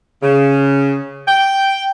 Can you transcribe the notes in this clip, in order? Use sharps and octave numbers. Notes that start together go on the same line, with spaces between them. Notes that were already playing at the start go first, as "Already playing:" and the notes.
C#3
G5